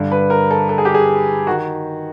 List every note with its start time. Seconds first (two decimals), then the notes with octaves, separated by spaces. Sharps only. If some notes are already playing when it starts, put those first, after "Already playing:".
Already playing: G2 D3
0.12 B4
0.30 A#4
0.51 A4
0.69 A4
0.78 G#4
0.85 G4
0.94 G#4
1.47 D#3 F#4